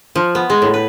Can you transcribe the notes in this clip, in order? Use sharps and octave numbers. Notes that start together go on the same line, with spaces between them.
F3
B3
G#3
A2
B4